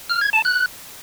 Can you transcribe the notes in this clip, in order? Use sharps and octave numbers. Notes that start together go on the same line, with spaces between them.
F6
G#6
A5
F#6